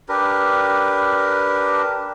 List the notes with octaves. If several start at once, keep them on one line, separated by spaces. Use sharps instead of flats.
D4 G4 A#4 B4